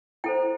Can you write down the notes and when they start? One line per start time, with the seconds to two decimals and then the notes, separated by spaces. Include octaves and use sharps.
0.24 E4 A4 C5 G5